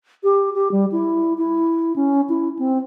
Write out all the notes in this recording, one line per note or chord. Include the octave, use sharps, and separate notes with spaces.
G4
G4
G3
E4
E4
C#4
E4
C4